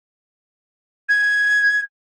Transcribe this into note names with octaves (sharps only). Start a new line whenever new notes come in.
G#6